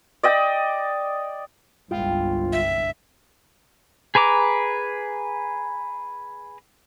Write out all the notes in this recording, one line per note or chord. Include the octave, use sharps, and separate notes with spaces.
D5 D#5 G5
G1 C2 G#3 E4 F4 G5
E5
G#4 B4 A#5 D6